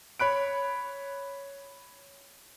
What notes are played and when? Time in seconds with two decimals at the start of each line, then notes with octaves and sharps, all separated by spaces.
0.20 C#5 B5 F#6 D7